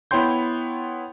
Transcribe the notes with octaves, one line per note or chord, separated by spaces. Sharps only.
B3 E4 C#5 G5 C6 G6